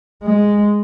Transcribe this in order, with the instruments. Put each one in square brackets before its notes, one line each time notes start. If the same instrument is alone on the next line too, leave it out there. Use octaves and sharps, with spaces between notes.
[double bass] G#3